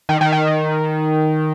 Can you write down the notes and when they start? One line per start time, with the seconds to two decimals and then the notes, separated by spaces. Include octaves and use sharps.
0.09 D#3
0.21 D#3
0.32 D#3